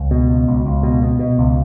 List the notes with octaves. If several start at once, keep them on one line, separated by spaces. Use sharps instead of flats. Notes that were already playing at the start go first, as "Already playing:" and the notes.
Already playing: C#2
B2
C#2
C#2
C#2
B2
B2
B2
C#2